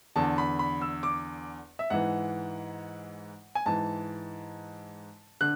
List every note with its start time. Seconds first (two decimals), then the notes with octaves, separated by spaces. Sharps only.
0.16 E2 D3 A5
0.38 B5
0.59 B5
0.82 E6
1.03 D6
1.79 E5
1.90 G#2 E3 F#5
3.55 G#5
3.66 G#2 E3 A5
5.41 D3 F#6